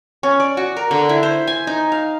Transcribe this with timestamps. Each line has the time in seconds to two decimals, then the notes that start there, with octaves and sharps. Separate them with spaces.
0.23 C#4
0.40 D5
0.57 F#4
0.77 A#4
0.91 D3
1.09 E4
1.23 C5
1.47 G#5
1.67 D#4
1.92 F5